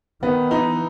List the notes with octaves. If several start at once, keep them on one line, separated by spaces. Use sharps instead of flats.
D#3 B3
E3 D#4